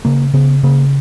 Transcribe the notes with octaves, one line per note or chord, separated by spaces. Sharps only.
C#3 A#3
C#3 B3
C#3 A#3